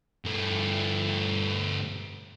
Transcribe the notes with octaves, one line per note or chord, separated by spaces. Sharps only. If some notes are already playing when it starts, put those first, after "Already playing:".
G2 A3